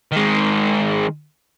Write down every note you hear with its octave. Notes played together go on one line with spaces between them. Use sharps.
D#3 G#3